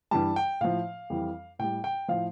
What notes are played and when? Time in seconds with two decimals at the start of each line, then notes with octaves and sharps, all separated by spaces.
0.11 G2 E3 G3 A5
0.36 G5
0.61 A2 F3 F5
1.10 F2 E3 G3
1.59 A2 G3 G5
1.84 G5
2.08 A2 F3 F5